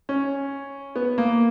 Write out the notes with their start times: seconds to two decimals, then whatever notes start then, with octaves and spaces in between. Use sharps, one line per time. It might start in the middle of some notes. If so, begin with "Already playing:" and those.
0.09 C#4
0.96 B3
1.18 A#3